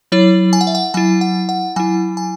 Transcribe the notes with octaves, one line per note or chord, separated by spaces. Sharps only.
F#3 E4 C#5
G#5
F#5
E5
F#5
F#3 E4 G#5
F#5
F#5
F#3 E4 G#5
G#5